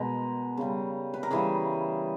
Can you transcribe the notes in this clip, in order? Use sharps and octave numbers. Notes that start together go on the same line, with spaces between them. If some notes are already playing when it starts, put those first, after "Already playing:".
Already playing: B2 G#3 A#4
C#3 G3
B4
A#4
C#3 E3 G3 G#4